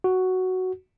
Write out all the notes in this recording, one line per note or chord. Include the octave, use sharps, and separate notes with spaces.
F#4